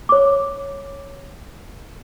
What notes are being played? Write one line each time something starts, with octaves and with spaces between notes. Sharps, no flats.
C#5 D6